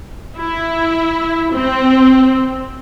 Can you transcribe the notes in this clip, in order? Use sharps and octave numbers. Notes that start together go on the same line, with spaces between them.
E4
C4